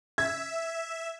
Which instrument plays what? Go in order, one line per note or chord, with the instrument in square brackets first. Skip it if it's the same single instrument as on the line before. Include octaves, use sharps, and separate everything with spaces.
[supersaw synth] E5 [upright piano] G#6